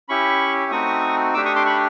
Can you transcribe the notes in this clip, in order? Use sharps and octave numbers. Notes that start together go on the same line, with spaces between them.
C#4 E4 G4 B5 C#6
A3 C4 D#4 F#4 C#6 D#6
A3 D4 G4 D6 E6
C#6 D#6
C6 D6
B5 C#6